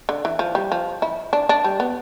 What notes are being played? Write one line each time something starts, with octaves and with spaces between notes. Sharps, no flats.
D3
E3
F3
G3
F3
E4
D4
D4
G3
B3